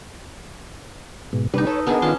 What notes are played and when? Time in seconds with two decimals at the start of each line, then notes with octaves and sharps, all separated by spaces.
1.33 G#2 B2
1.54 C3 G3 D4 D#4 B4
1.67 A4 C#5
1.87 B3 D4 G#4 A#4 D#5
2.02 D#3 C#4 F4 A5 C6